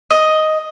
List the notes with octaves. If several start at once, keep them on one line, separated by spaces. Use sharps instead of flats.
D#5